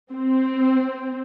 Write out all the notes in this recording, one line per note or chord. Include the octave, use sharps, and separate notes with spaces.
C4